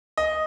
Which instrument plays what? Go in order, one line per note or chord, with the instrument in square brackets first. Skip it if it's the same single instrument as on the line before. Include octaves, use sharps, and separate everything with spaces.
[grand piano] D#5